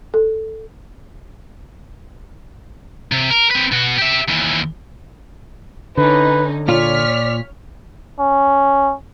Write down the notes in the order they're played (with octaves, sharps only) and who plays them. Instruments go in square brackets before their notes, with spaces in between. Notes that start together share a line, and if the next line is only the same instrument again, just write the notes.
[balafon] A4
[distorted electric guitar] C3
A#4
C4 B4
B2 F#4
G4 E5
D#2 E3
[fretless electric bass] D3 [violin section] C#4 D#4 [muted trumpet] B4
[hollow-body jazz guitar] A#2 F4 [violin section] C#5 F6 B6 [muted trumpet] D5
[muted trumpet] C#4